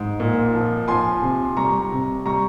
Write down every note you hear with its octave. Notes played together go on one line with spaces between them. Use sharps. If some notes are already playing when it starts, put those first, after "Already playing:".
Already playing: G#2
A#2
F3
F3 G#5 C6
C3
G3 A#5 C#6
C3
G3 A#5 C#6